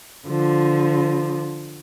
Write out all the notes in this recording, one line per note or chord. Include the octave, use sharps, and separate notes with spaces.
D3 F3